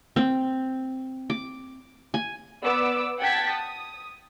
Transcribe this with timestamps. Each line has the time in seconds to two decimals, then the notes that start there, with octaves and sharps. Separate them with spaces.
0.16 C4
1.30 D6
2.14 G#5
2.63 B3 D5 D6 E6
3.19 F#5 G5 A5 G#6 A6 B6
3.51 D#6